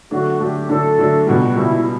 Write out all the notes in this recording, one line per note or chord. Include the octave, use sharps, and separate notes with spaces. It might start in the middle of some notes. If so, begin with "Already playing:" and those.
D3 F#3 A3 D4 F#4
D3 F#3 A3 D4 G4
D3 F#3 A3 D4 A4
D3 F#3 A3 D4
C#2 B2 G3 F#4
C#2 B2 G3 E4